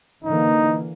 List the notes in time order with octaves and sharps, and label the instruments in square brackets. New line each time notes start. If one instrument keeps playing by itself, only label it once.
[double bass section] D3 E3 A#3 [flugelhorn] D#4